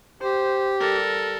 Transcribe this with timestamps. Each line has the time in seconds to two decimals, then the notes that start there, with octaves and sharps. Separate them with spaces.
0.21 G4 C5
0.80 G3 A4 A#4